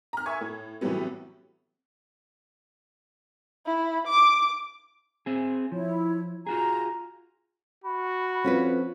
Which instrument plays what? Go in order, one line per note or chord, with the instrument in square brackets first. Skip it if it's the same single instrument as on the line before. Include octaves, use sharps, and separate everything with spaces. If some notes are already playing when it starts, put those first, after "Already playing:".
[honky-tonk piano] A#5 F6
E5 G#5 C#6 G#6
A2
A2 C3 E3 F#3 G3 B3
[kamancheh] E4
D6
[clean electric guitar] C4 G#4
[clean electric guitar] F3 [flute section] E4 C#5
[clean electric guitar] F4 F#4 G#4 [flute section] A#5
[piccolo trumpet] F#4 [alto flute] B5
[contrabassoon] F2 [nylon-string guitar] C#4 F4 B4